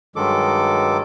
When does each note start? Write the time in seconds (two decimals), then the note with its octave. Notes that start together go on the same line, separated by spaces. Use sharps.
0.16 G2 D#3 F#3 G#3 A4 D6